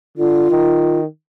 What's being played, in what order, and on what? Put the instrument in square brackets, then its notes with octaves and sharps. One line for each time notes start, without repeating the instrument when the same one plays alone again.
[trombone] D3 [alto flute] F4
[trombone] D#3